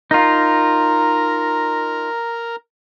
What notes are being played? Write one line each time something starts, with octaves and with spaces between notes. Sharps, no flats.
D#4 F4 A#4 A#5